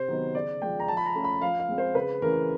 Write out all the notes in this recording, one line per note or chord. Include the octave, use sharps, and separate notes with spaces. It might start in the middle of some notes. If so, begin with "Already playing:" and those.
Already playing: C3 C5
D#3 F#3 B3 D#4
C#3 D5
F3 G#3 G5
A#5
F3 A5
B5
A#5
A3 C#4 F4
B5
F3 F5
F5
G#3 C4
C5
C#3 B4
E3 A3 C#4 A#4